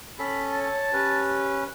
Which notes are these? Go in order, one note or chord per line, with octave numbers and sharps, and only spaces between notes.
C#4 A4 B5
C#5 A5
C#4 G4 B4